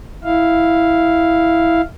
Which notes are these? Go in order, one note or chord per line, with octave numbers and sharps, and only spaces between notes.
E4 F5